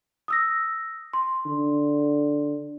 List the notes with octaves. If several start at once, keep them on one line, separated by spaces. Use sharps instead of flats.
D#6 E6 A#6
C6
D3